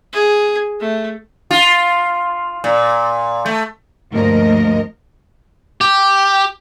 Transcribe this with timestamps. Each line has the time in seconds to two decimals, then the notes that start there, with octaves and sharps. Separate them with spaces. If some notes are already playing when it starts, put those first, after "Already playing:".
0.13 G#4
0.80 A3
1.51 F4
2.64 A#2
3.46 A3
4.11 D2 G2 F3 A#3 A#4 D#5
5.81 G4